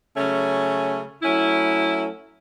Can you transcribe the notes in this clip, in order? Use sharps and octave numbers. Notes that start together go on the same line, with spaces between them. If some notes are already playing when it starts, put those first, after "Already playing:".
C#3 F#3 A3 C#4
F#3 A3 C#4 E4